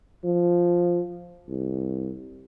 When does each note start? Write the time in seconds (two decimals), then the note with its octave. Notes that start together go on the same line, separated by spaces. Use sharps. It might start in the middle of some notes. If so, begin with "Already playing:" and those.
0.24 F3
1.49 C2